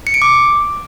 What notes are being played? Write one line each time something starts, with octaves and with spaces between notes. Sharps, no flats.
C#7
D7
D6